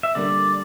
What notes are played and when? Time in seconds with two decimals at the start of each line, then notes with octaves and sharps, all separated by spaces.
0.03 E5
0.15 D3 G3 A#3 D5